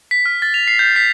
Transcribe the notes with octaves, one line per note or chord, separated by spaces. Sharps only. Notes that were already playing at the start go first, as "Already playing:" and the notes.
B6
F6
A6
F7
C7
G6
B6